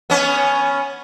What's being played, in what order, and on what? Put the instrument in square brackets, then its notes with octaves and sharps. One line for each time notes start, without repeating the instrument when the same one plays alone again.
[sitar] B3 C#4